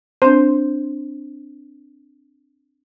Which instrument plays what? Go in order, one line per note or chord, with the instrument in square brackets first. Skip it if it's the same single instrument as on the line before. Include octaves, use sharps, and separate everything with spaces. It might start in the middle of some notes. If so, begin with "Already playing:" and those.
[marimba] C4 D4 [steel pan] C5